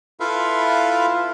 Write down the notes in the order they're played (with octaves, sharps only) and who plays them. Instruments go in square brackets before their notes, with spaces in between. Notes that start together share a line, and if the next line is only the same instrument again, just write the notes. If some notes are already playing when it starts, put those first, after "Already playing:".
[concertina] E4 F4 A4 B4 E5 F5